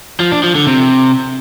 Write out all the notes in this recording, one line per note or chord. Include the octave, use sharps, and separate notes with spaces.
F3
D4
F3
D3
C3